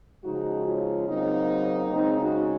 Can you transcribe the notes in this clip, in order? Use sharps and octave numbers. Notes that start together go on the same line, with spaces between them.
C#3 F3 G#3 D#4 F#4
C#4 F4
C#3 F#3 A#3 C4 D#4
C#3 G#3 C4 D#4
D#4 F#4